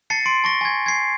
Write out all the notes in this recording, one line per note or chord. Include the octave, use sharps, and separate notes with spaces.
A5 A6 C7 C#7
C6 D7
A5 C#6 A#6
G#5 G#6
G#6 C7